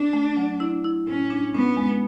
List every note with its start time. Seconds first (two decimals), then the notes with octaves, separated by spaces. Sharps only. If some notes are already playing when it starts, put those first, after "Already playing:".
Already playing: D4
0.13 A3
0.37 F#3
0.60 E4
0.84 E4
1.07 A2 C#4
1.30 D4
1.54 B3 C#4
1.77 G#3